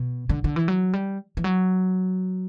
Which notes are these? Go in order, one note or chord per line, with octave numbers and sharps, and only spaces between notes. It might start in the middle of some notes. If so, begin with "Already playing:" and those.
Already playing: B2
D3
D3
E3
F#3
G3
E3
F#3